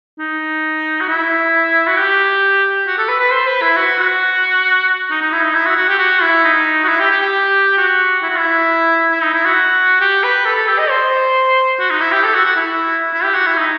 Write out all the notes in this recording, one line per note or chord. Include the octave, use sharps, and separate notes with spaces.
D#4
F#4
E4
F#4
G4
F#4
A4
B4
B4
C5
B4
E4
F#4
F#4
D#4
D#4
E4
D#4
E4
F#4
F#4
G4
F#4
E4
D#4
F#4
E4
G4
G4
G4
F#4
E4
F#4
E4
E4
D#4
E4
F#4
G4
B4
A4
A4
G4
D#5
C5
F#4
D#4
E4
G4
A4
F#4
F#4
E4
E4
G4
F#4
E4
D#4